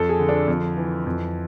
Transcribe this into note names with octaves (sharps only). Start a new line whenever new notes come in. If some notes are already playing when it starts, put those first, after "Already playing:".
Already playing: F2 A4
G#4
D3
D4
F2
E3
F2